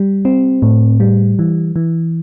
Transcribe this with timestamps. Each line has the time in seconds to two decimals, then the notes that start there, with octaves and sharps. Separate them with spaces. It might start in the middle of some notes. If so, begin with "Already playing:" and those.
Already playing: G3
0.25 C4
0.62 A2
1.00 G3
1.39 E3
1.76 E3